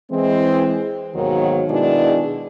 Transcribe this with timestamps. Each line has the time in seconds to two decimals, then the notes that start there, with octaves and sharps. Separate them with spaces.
0.11 E3 G#3 C4
1.14 D#2 G#2 B2 D#3 F#3 D#4
1.69 B2 D#3 G#3 D4 E4 G#4